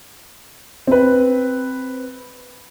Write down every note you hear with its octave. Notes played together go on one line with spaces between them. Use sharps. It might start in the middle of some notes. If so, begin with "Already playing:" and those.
C4 B4